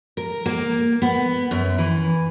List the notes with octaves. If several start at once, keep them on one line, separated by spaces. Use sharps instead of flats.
A#4
A#3
B3
F#2
E3